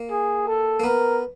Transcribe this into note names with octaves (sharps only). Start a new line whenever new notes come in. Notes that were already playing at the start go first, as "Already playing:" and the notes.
Already playing: A#3
G#4
A4
A#3
B3 A#4